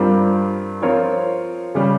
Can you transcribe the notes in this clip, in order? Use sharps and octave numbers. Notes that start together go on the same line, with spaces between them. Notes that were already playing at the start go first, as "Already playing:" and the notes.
Already playing: G2 G3 C4 F4 A#4
F3 C4 F4 A#4 C#5
C#3 G3 C#4